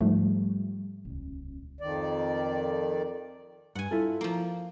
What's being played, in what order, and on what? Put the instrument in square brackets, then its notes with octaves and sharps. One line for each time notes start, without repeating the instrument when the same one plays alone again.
[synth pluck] G#2 F3 A3 [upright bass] G3
[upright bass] D#1 C#2
[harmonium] F2 D#3 D5
[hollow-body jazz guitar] G2 [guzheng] F#5 G#5
[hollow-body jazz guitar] E4 F4 A4
[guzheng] F3 A#3